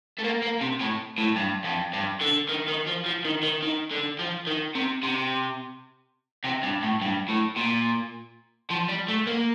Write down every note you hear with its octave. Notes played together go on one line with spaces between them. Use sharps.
A3
A#3
A#3
C3
A2
A2
G2
F2
G2
D3
D#3
D#3
F3
F3
D#3
D#3
D#3
D3
F3
D#3
C3
C3
C3
G2
A2
G2
A2
A#2
F3
G3
A3
A#3